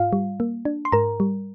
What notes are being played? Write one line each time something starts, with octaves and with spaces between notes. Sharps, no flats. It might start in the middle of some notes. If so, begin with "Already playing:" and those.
Already playing: G#2 F4 F5
G3
A#3
D4
C6
G#2 A#4 A#5
G3